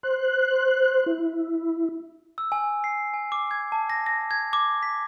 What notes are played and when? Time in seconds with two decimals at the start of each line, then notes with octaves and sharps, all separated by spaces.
0.03 C5 F#6
1.06 E4
2.38 E6
2.52 G#5
2.84 C7
3.14 G#5
3.32 D6
3.51 G#6
3.72 A5
3.90 A#6
4.06 A#6
4.31 G#6
4.53 D6
4.83 B6